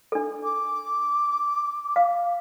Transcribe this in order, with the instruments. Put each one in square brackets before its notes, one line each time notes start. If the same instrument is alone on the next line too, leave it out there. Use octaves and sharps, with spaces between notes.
[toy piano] D4 A4
[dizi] D6
[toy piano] F5